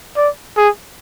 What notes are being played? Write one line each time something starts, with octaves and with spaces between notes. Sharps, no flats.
D5
G#4